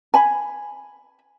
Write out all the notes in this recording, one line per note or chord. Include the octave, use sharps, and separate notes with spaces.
G#5 B5